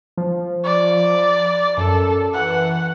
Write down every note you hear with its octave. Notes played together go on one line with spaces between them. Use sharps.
F3
D5
F#2 A4
E3 F#5